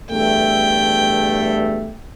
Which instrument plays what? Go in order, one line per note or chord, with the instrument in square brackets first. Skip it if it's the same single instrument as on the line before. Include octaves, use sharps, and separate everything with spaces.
[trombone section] E2 G2 A3 [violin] G5